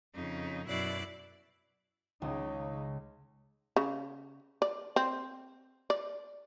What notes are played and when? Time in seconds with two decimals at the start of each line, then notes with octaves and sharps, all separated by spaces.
0.14 F2 C#3 D#4
0.67 F#2 B2 E4 D5 F#6
2.22 C#2 C#3 D#4
3.76 C#3
4.62 D5
4.96 C4
5.90 D5